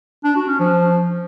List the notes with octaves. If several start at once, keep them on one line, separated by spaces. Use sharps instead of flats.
D4
F#4
C#4
F3